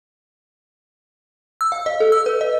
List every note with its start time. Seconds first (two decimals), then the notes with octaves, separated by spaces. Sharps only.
1.61 E6
1.72 F5
1.86 D#5
2.00 A4
2.12 E6
2.26 B4
2.41 D#5